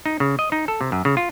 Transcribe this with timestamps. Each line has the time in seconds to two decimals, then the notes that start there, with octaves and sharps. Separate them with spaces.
0.06 D#4
0.20 C#3
0.39 D#5
0.52 D#4
0.68 A4
0.81 C3
0.92 F#2
1.05 C#3
1.17 F4